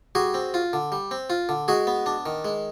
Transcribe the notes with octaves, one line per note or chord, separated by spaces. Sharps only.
G3 F#4 G#4
C4
F4
D3
G3
C4
F4
D3
G#3 F#4 G#4
B3
D4
D#3
G#3